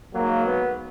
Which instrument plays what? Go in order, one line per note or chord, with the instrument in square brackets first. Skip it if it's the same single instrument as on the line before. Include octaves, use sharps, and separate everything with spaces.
[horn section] G#2 F#3 A#3
B3